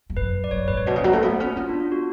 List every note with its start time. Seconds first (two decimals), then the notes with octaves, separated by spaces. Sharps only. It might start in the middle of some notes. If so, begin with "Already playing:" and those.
0.10 F2
0.17 F#2 B4
0.44 D5
0.51 F#2 C#5
0.68 G#2 B4
0.77 C#5
0.86 B2 D5
0.96 C#3
1.04 F#3
1.13 A3
1.23 B3
1.40 C#4
1.57 B3 F4
1.69 D4
1.80 F4
1.92 F#4